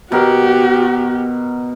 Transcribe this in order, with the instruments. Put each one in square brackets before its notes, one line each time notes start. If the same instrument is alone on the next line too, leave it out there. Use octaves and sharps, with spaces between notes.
[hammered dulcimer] B2 A#4 F#5 [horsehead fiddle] F#4 G4